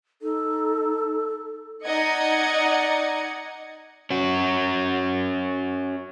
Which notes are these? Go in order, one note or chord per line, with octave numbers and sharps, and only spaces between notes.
D#4 A4
D#4 D5 D#5 F#5 G#6 C#7
C#4 F#4